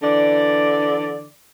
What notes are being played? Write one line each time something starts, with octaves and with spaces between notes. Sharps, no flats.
D3 E3 D5